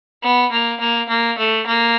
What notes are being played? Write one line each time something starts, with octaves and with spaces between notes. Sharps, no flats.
B3
A#3
A#3
A#3
A3
A#3